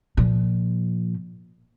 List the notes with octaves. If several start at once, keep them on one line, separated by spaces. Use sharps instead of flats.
A#2 F3